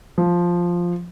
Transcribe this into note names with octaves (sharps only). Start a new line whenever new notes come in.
F3